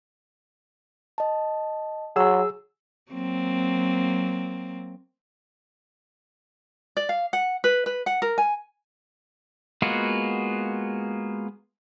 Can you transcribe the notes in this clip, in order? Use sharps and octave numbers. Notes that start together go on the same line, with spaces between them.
D#5 A5
F#3 G#4 E6
F#3 A#3 C4
D5
F5
F#5
B4
B4
F#5
A#4
G#5
G#3 A#3 B3 F4 F#4